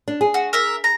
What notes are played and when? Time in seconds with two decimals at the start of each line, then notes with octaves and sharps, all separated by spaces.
0.08 D4
0.21 G#4
0.34 F#4
0.53 A#4 E5
0.84 A#5